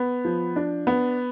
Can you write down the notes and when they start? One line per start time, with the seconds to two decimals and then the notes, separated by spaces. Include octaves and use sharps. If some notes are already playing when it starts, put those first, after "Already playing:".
Already playing: B3
0.25 F3
0.56 D4
0.87 B3